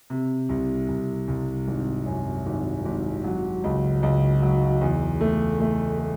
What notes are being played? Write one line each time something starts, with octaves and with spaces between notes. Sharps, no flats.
C3
C2
C2
C2
G#1
F#2
G#1
G#1
F#3
C#2
C#2
F#3
E2
A3
A3
A3